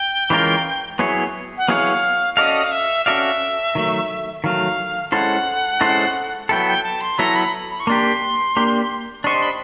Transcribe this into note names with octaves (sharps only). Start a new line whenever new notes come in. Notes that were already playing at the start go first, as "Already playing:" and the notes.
Already playing: G5
E3 G#3 C#4 F4 A#4
F#3 B3 E4 G#4 C#5
F#5
F#3 B3 E4 G#4 C#5 F5
C#4 F#4 A4 D5 D#5 F5
F5
E5
C#4 F#4 A4 D5 E5 F5
D#3 F#3 A3
D#3 F#3 A3 F5
G#3 C#4 E4 A4 C5 F#5
G#3 C#4 E4 A4 C5
F#3 B3 E4 A4 G5
G5
A5
C6
F#3 B3 E4 A4 A#5
B5
B5
C#6
A#3 D4 G4 C6
A#3 D4 G4
D4 G4 C5 D#5 C#6
C6
B5